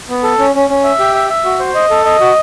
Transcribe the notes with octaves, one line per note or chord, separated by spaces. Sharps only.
B3
A4
C#4
C#4
C#4
E5
G4
E5
E5
F#4
C5
D#5
A4
D#5
F#4